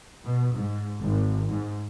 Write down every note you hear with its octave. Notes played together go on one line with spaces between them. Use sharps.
B2
G#2
G#1
G#2